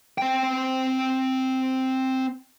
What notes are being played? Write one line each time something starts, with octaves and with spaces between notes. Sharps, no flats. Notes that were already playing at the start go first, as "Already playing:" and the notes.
C4 G5